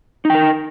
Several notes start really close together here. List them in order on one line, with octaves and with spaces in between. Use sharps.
D#4 G5 A#4